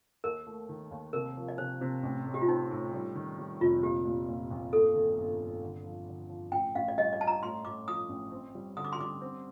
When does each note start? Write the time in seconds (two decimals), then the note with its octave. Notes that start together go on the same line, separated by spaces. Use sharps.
0.24 D#2 A#4
0.47 A3
0.69 D#3
0.91 D#2
1.13 C3 A#4
1.37 F3
1.48 D5
1.58 C3 C5
1.81 C3
2.03 A1
2.25 A2
2.34 G4
2.41 F4
2.49 C4 D#4
2.71 A2
2.93 G3
3.15 D#3
3.39 G3
3.61 F1 F4
3.83 A#2 G4
4.05 A#2
4.28 A#2
4.51 A#1
4.73 G1 A4
4.95 D#3
5.17 G1
5.41 G1
5.63 D3
5.85 F3
6.08 D3
6.29 F3
6.52 A1 G5
6.75 A1 F5
6.88 D5
6.98 G3 D#5
7.13 D5
7.19 D4 A5
7.27 A#5
7.42 A2 C6
7.65 A2 D6
7.88 F3 D#6
8.09 A1
8.31 C4
8.55 G3
8.77 D3 D#6
8.85 D6
8.93 C6
8.99 G3 D6
9.21 C4